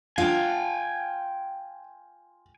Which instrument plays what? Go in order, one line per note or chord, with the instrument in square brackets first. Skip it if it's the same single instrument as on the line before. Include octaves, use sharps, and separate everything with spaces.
[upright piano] F4 [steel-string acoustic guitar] F5 [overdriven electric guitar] G5 G#5